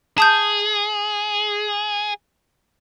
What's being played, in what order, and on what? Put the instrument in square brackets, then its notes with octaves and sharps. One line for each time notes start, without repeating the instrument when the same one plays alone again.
[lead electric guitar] G#4 [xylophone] A5 D#6 G6